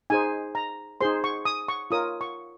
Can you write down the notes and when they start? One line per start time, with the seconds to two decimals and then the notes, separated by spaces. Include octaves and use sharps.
0.10 D#4 G#4 C5 G#5
0.55 A#5
1.01 D#4 G#4 C5 C6
1.24 C#6
1.45 D#6
1.68 C#6
1.91 F4 A#4 C#5 D#6
2.21 C#6